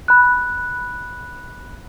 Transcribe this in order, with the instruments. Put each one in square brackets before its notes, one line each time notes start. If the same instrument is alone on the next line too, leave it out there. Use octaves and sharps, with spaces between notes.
[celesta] B5 F#6